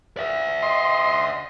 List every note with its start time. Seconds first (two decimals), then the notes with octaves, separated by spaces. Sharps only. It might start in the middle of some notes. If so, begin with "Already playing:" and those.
0.17 D5 E5
0.63 D#5 C6